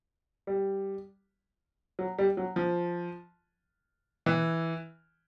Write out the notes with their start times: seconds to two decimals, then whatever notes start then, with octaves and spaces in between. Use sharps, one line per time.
0.47 G3
1.99 F#3
2.18 G3
2.37 F#3
2.56 F3
4.26 E3